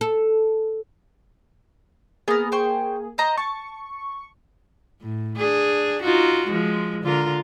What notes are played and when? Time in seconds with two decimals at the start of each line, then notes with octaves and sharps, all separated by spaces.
0.01 A4
2.28 A#3 B3 G#4 A#4
2.52 C5 G5 C#6
3.18 C5 D#5 A#5
3.37 A5 C#6
5.01 A2
5.37 D4 G#4
6.02 D#4 F4 F#4
6.47 F3 G#3
7.03 D3 F4 A#4